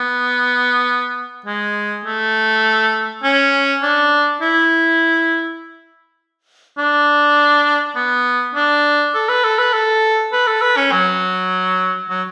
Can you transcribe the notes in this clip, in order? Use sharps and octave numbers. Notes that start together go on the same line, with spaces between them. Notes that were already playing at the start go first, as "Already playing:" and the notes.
Already playing: B3
G#3
A3
C#4
D4
E4
D4
B3
D4
A4
B4
A4
B4
A4
B4
A4
B4
C#4
F#3
F#3